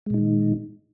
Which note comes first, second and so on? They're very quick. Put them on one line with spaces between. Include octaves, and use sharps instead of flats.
G#3 A#2 D#4 D#3